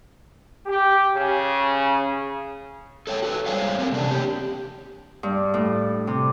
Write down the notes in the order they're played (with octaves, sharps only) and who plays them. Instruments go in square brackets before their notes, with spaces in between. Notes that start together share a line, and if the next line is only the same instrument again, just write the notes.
[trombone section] G4
C#3
[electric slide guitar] A4 C#5 F#5 G5
F#4 A4 B4
G3 G#3 A4 C5 C#5 F5
C4 A#4
C3 F#3 C#4 D4
A#3 G4
[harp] G2
A2
C3